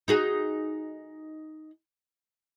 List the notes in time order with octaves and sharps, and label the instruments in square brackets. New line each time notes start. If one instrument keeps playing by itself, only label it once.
[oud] D#4 F#4 G#4